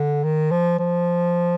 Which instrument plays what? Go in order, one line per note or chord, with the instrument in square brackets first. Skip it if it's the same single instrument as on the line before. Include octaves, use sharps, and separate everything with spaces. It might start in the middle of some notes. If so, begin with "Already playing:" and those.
Already playing: [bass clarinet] D3
D#3
F3
F3